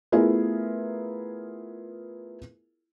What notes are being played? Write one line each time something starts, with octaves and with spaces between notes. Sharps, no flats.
A3 B3 E4 F4 G#4 A#4